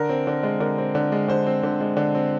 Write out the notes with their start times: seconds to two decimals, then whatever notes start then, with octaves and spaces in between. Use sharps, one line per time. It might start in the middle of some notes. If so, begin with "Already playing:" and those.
Already playing: D3 A#4
0.09 C4
0.27 D3
0.43 G#3
0.60 D3 A#4
0.78 C4
0.95 D3
1.12 G#3
1.28 D3 C5
1.47 C4
1.63 D3
1.80 G#3
1.97 D3
2.15 C4